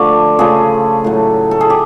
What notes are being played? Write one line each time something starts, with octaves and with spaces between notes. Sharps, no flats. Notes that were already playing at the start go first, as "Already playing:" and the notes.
Already playing: D3 F3 A3 D5
C#3 F3 A3 G#4
A2 F#3 A3
A4
G#4
G4